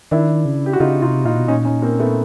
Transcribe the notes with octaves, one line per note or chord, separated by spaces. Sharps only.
D#3 D4 E4
C#3
G4
F#4
C#3 D#4 F4
C3 D#4 F4
A#2 D#4 F4
B2
A#2 C#4 D#4
C#4 D#4
A#3 C4
A3 B3